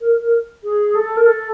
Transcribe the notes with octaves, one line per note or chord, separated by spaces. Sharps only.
A#4
A#4
G#4
A4
A#4
A4